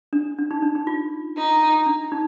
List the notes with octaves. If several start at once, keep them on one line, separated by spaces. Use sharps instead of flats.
D4
D4
D#4
D4
D#4
F4
D#4 F4
D4
D#4